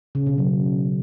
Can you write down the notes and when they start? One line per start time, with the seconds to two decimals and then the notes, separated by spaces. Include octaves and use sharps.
0.15 C#3
0.26 B2
0.38 F#3